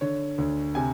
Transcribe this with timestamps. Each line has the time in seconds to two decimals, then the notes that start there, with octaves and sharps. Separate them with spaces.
0.01 D3 C#5
0.38 D2
0.75 C3 G#5